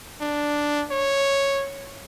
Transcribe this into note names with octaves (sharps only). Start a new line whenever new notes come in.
D4
C#5